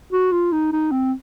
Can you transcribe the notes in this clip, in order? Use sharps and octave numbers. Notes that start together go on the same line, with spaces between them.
F#4
F4
D#4
D#4
C4